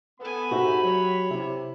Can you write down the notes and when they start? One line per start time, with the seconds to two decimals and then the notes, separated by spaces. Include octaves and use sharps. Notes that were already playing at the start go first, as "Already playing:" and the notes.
0.20 B3 A4 G#5 B5
0.51 G#2 C3 D#4 F#4 G4 E5
0.84 F#3 C#5
1.31 C3 E4